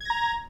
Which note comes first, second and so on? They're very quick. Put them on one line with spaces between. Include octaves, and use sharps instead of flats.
G#6 A#6 A#5